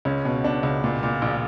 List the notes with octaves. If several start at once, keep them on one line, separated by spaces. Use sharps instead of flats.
C#2 C#4
B2
B2 D4
C#2
A#2
A#2
A#1